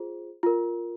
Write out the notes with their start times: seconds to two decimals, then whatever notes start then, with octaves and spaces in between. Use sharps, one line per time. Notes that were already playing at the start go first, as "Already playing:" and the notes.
Already playing: F4 G#4 C5
0.43 F4 A#4